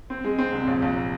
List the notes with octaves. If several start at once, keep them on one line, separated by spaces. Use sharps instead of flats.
C4
G#3
C4
C2
A#1
A#1